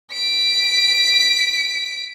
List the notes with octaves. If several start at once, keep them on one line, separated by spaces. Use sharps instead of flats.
B6 D7